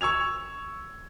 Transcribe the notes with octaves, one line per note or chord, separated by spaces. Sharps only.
C#6 E6 G#6 F7